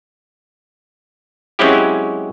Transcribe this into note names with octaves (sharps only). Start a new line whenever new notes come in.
F#3 G#3 C4 C#4 E4 G4